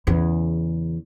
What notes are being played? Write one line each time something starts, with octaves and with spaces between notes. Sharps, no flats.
E2 C#3